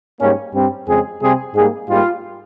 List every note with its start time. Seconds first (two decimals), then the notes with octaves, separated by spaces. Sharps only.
0.19 G#2 G3 A#3 C#4
0.53 G2 G3 C4
0.87 F2 C#3 G#3 C4 G#4
1.21 C3 G3 C4 G#4
1.55 G#2 G3 A#3 G#4
1.88 G#2 G3 A#3 F4